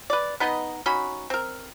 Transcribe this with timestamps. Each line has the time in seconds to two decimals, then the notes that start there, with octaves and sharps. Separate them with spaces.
0.10 B4 D5
0.40 B3 D#4 B4 D#5
0.86 C#4 D#4 F#4 B5
1.30 C4 A#4